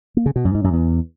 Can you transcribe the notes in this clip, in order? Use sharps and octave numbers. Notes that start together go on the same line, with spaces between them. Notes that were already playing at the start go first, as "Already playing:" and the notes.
A#3
C#3
B2
F#2
G#2
F#2
E2